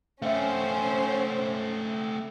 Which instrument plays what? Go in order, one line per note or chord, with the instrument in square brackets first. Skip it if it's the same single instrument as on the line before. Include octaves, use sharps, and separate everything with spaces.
[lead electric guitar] A3 C4 [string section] C#4 C5 [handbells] E5 F5